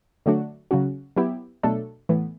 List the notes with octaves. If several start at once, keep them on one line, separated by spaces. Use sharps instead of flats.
D3 F#3 A3 D4 F#4
C#3 F#3 C#4 F#4
F#3 B3 E4 G4
B2 F#3 A3 D4 A4
A2 E3 B3